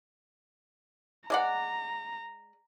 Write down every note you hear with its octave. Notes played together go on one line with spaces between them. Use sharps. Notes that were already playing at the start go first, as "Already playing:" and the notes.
G#3 D5 F#5 A#5